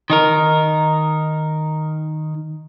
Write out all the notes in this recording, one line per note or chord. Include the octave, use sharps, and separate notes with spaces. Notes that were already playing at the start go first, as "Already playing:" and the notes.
D#3 D#4 A#4